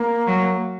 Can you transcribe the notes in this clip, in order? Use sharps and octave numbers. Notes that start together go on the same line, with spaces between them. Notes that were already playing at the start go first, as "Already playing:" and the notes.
Already playing: A#3
F#3